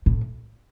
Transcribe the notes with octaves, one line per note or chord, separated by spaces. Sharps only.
A2